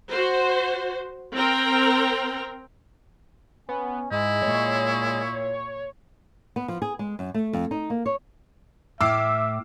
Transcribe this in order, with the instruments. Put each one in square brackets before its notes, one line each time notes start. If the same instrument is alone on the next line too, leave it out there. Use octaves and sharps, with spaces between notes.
[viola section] F#4 C5
C4 A#4 G5 A#5 C6
[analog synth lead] B3 [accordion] C#4
[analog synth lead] G#2 [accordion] G#3 D#5 [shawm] E4
[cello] A#2 [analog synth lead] C#5
[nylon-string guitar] B3
F3
G#4
G#3
F#2
A3
F2
D#4
A#3
C#5
[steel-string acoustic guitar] A2 [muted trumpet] E5 [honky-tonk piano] D6 F6 C7 [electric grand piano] E6